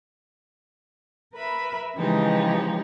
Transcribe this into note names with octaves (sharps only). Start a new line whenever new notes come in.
A#4 B4 E5 B5
C#3 E3 F3 G#3 D#4 G4